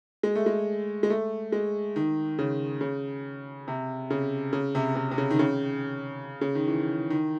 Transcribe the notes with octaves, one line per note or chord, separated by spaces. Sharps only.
G#3
A3
G#3
G#3
A3
G#3
D#3
C#3
C#3
C3
C#3
C#3
C3
C3
C3
C#3
D#3
C#3
C#3
D#3
E3
D#3